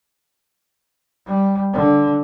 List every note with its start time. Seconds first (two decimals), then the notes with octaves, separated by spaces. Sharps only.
1.26 G3
1.74 D3